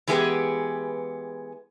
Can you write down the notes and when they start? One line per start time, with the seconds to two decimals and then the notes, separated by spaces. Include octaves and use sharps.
0.08 E3 G#3 B3 G4 G#4 B4